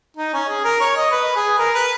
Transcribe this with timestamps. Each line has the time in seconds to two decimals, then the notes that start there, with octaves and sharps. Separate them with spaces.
0.17 D#4
0.33 C#4
0.48 G#4
0.65 A#4
0.80 C#5
0.97 D#5
1.12 B4
1.36 G#4
1.58 A#4
1.74 B4